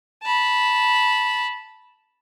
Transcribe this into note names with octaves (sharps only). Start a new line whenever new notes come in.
A5 B5